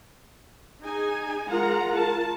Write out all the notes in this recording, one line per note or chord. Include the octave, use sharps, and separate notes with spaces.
D#4 G#4 G#5
G#3 F4 A#4 F#5 A#5
A5